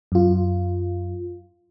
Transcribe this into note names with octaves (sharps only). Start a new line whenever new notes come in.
F#2 F4